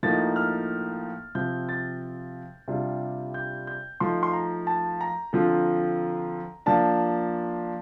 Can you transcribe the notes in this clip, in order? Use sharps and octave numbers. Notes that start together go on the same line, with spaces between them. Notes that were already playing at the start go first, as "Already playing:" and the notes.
A2 F3 A#3 D#4 A6
F6
C3 F3 C4 G6
A6
C3 G3 D4 F4
G6
G6
F3 A3 D#4 C6
C6
A#5
A5
A#5
D3 F3 C4 F4
F3 A#3 D4 F4 A5